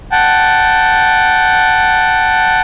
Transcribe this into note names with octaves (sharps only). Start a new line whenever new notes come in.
F#5 G5 A5